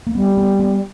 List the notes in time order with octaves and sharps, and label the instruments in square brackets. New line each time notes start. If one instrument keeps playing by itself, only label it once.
[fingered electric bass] A#3
[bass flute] G3 [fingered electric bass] B3
[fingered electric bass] B3
B3